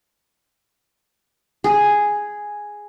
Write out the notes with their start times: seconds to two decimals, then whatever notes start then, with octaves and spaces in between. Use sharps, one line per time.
1.64 G#4